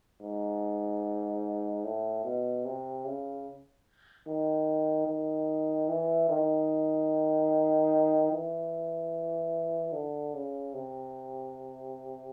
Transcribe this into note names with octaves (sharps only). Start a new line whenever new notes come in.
G#2
A2
B2
C3
C#3
D#3
D#3
E3
D#3
E3
D3
C#3
C3